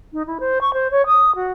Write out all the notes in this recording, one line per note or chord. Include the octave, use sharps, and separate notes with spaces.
D#4
E4
C5
C#6
C5
C#5
D#6
F#4